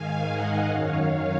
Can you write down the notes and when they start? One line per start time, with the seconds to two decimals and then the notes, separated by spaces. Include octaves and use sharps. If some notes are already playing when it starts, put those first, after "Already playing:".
Already playing: G#2 D#3 F5 G#5
0.29 D#5 F#5
0.70 F#2 D#3 C#5 F5